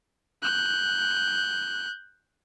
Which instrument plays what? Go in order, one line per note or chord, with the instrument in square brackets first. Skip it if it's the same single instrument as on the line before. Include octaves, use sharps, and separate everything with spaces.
[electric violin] F#6 G6